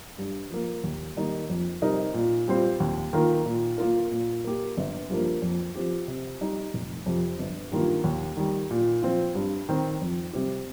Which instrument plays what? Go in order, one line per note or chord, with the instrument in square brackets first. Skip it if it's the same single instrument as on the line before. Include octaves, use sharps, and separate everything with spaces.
[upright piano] G2
F3 A#3
D#2
D#3 G3 A#3 D#4
F2
C3 G3 D#4 A#4
A#2
G3 C4 F4 C5
D#2
D#3 A#3 F4 A#4
A#2
A#3 F4 A#4
A#2
A#3 G4
G1
G2 F3 A#3
F2
F3 C4 G4
C3
G3 D#4
F1
F2 C3
G1
G2 D#3 A#3 F4
D#2
D#3 G3
A#2
F3 C4 F4
G2
D#3 C4
F2
C3 G3 C4 G4